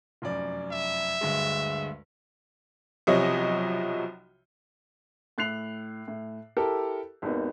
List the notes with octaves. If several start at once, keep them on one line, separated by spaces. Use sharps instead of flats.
F1 F#2 D5
E5
D2 G2 G#3
B1 C3 F3 C#5 D#5
A2 F#6 C7 F7
A2
E4 G4 A4 A#4
G#1 D#2 B3 D#4